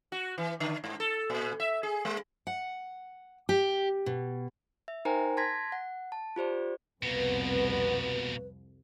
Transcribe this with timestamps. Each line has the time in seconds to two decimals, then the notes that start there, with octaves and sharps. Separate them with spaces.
0.12 F#4
0.38 E3
0.60 D3
0.84 G#2
1.00 A4
1.30 A#2
1.60 E5
1.83 G#4
2.05 G#3
2.47 F#5
3.49 G4
4.06 B2
4.88 E5
5.05 D#4 A#4 C5 G5 G#5 A#5
5.37 A5 C6 G#6 A#6 B6
5.72 F#5
6.12 A5
6.36 F4 G4 C5 D5
7.03 C2 F2 B2 A#3 B3 B4